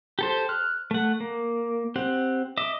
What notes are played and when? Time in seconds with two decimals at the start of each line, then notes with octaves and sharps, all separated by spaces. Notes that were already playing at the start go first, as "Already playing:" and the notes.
0.19 G4 A4 C5
0.49 F6 F#6
0.91 A3 F#5
1.20 A#3
1.96 C4 G4 F#5
2.57 D#5 E5 D6